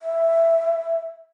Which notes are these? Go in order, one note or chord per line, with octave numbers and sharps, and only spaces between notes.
E5